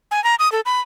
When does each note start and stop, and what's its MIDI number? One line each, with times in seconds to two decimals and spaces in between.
0.11 0.23 80
0.24 0.35 82
0.39 0.51 87
0.52 0.60 69
0.66 0.80 83